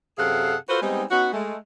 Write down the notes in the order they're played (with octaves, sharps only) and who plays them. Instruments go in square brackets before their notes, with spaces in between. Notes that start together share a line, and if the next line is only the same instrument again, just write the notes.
[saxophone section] F#2 C3 G#4 A4 F5 F#5
F4 F#4 A4 B4 C5
G3 G#3 B3 C4 D#4
B3 C#4 D#4 F#4
G#3 A3